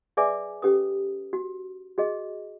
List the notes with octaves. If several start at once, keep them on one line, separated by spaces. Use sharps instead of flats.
G#4 B4 D5 E5 G#5 D6
C#4 G4 A4 B4 D#6
F#4
F#4 G#4 D#5